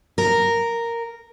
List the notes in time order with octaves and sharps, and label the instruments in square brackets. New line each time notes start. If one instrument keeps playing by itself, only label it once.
[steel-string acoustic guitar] A#4